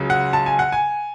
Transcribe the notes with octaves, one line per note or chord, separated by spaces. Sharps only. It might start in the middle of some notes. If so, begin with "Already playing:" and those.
Already playing: C#2 C#3 F#3
F#5
A5
G#5
F#5
G#5